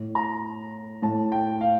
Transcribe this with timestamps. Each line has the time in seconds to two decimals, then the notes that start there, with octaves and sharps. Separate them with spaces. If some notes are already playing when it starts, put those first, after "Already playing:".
Already playing: A2
0.15 A#5
1.02 A2 A5
1.32 G5
1.61 F5